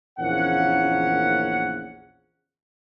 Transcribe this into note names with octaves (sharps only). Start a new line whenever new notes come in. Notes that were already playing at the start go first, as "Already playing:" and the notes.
A#1 E2 C#3 A#3 C#4 F#5